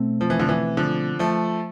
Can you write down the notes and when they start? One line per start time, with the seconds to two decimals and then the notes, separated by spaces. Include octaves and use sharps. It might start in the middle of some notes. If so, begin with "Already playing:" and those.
Already playing: B2 A3 C4
0.21 F3
0.30 E3
0.39 D3 F3
0.49 E3
0.77 D3 F3
1.19 F3 A3